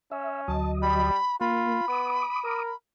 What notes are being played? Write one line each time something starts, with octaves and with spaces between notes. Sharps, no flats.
C#4 E5
D2 F#3 D#5 A5
G3 B5
A#3 F4 B5
B3 D6 D#6
A#4